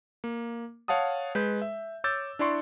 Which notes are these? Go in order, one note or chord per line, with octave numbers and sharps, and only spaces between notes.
A#3
C#5 F5 F#5 A5 D#6
G#3 B4 G6
E5
C#5 D6 E6 G6 A6
D4 E4 D5 C6 C#6